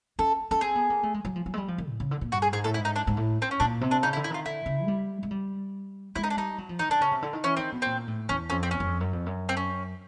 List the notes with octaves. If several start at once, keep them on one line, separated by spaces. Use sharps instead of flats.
C#4 A4
C#4 A4
C4 G#4
B3
A#3
A3
G#3
F#3
F3
F#3
G#3
G3
F3
D#3
A2
C#3
D3
A#2
G2 F#4
G#4
G#2 G#4
A2 A4
E4
G#2
D#4
D4
G#2
A2
C4
C#4
A#2 D4
C3
D4
C#3 D#4
E4
D3
E4
D#3 F4
D3 E4
C#3
G#3
G3
G#3
G3
G#3 E4
D#4
D4
G3 D#4
F#3
F3
D#3 D#4
D3 D4
C#3 C#4
C3
D3
D#3
E3 C#4
D#3 C4
B2
A#2 C4
A2
E2 C#4
F2 C#4
C4
E2 C#4
F#2
F2
F#2
F2
F#2
C4
C#4